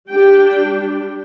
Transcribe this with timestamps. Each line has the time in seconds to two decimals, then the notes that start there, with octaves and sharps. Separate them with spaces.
0.11 G3 D4 G4 G5